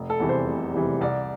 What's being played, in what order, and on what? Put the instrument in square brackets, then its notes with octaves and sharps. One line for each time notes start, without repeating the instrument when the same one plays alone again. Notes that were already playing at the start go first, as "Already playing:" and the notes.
Already playing: [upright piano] F1
A4
E2 C3 E3 G3
C5
F1
E2 C3 E3 G3
C2 D5